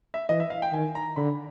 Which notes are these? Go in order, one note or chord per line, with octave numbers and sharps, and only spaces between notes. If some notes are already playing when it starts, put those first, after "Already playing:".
E5
E3 D#5
E5
F5
G5
D#3 G#5
A#5
D3 B5